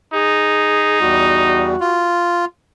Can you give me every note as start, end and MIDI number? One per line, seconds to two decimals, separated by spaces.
0.14 1.71 63
0.14 0.98 68
1.01 1.76 40
1.01 1.76 55
1.01 2.11 66
1.80 2.45 65